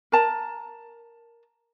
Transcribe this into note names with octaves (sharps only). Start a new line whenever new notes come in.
A#4 A5 A#5